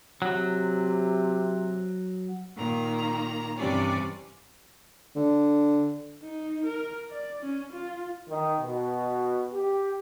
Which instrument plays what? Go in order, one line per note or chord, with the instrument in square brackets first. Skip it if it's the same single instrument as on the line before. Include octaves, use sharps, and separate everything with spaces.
[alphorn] C3 [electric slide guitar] F#3
[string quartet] A#2 D#3 A#3 A#5
G2 C3 E3 G3 C#4 D5
[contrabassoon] D3
[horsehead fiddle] D#4
A#4
D5
C#4
F4
[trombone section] D#3
B2
G4